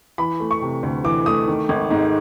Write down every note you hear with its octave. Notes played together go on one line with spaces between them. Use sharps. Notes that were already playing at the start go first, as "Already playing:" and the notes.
E3 B5
A3
C#6
C3
D2
E3 D6
A3 D#6
D#3
G#1
G#2